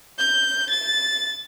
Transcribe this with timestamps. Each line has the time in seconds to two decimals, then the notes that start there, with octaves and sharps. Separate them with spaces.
0.19 G6
0.70 A6